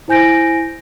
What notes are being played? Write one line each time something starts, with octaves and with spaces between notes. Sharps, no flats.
E4 C5 G#5 G6 A#6 D7